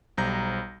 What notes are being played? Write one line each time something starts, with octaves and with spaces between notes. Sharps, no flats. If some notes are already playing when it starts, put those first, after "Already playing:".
B1 G3 C5 A#5 G6 A#6